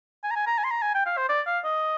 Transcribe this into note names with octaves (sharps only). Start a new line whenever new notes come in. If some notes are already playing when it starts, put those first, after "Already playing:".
G#5
A#5
G#5
A#5
G#5
C6
A#5
G#5
G5
F5
C5
D5
F5
D#5